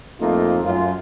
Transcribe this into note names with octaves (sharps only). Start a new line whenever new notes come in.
F2 A3 A#3 D#4 F4
F#2 F4